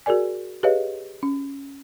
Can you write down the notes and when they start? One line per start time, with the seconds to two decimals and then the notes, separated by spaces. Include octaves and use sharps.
0.06 F#4 G#4 A#4 D5 G#5
0.63 G4 G#4 B4 C#5 D#5 F5
1.23 C#4